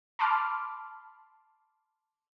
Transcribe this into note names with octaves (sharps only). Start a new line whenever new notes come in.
A5 B5 C6 D6 F6